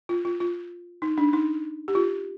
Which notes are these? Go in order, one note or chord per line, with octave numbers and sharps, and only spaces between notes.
F4
F4
F4
D#4
D4
D#4
G4
F4